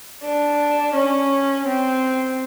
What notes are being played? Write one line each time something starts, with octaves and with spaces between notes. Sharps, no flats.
D4
C#4
C4